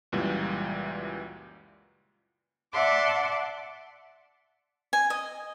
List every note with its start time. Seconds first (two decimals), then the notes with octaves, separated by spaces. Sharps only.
0.12 C#2 F#2 A#2 E3 G3
2.72 D5 E5 F#5 A5 C6 D6
4.93 G#5
5.10 D#5